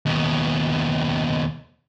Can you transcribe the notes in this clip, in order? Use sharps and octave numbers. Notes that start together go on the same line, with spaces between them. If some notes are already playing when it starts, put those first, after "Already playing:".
D#2 B2